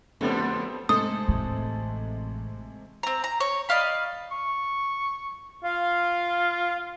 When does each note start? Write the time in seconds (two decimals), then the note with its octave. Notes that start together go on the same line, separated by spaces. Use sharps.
0.21 F2 D3 G3 A3 B3 C4
0.89 C3 G#3 A3 A4 C5 D#6
1.28 A1
3.03 C4 A#5
3.24 A#5
3.40 C#5
3.69 D5 D#5 F5 B5
4.32 C#6
5.64 F4 F5